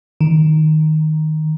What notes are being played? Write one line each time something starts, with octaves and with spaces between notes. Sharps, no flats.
D#3